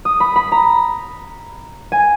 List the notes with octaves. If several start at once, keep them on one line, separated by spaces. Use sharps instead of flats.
D#6
B5
B5
A#5
G#5